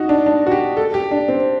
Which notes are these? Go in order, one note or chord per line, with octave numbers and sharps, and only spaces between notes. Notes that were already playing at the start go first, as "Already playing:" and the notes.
Already playing: D#4 F#4
D4
D4
F#4
G4
A4
G4
D4
C4